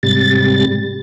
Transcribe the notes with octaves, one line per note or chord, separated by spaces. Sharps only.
G#2 C3 G3 A6